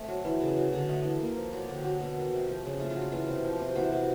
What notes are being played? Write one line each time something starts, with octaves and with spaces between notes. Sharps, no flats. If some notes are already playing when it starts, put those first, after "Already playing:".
Already playing: A3 C4
F#3
E3
C#3
F#3
D3
A3 D#5
E3
A#3
F3
F#3 D5
C#5
D3
G4
F#3 F#4
B2
D#3
C3
F3
C#3
A3 F4
F4
F#3
F4
E3 F4
C3
F3
C3
E3 F#4
C3